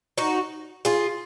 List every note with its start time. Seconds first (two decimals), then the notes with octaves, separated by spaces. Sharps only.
0.18 D#4 F#4
0.85 F4 G#4